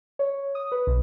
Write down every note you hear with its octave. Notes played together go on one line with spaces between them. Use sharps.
C#5
D#6
B4
B1